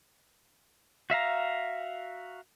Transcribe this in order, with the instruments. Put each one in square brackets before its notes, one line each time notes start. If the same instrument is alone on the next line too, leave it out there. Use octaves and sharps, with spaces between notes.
[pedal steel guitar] F#4 E5 F5 A#5